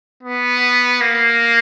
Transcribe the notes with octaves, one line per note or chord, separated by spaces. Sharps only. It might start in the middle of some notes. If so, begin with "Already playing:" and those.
B3
A#3